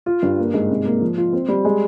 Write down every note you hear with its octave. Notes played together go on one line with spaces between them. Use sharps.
F4
G2
A#3
G#2
C3
A#3
F3
F4
C4
G3
G#3